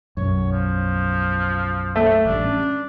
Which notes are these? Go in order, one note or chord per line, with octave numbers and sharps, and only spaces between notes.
B1 F#2 C#5
F3
A3
A1 G3 D4
C#4